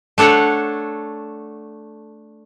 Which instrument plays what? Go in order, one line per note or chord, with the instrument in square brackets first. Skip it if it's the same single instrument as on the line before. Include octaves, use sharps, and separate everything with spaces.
[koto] A3 D4 A4 C#5 F#5